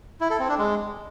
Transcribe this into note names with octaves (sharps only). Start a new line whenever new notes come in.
E4
A4
C4
D4
G#3